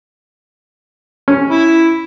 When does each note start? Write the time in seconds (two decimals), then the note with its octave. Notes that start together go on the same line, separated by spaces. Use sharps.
1.28 C#4
1.50 E4